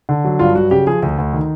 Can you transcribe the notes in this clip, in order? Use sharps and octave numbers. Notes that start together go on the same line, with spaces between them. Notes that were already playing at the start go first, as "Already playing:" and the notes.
D3
F#3
G2 F4
F#3 F#4
C#3 G4
F3 G#4
D2
D2
D#3